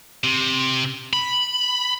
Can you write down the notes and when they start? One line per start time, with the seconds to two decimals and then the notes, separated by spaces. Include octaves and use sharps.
0.24 C3
1.13 B5